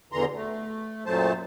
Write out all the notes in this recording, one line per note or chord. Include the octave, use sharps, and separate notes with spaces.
E2 B2 D3 E3 A#5 C6
A3
F#2 A#2 F#3 A3 C5 A5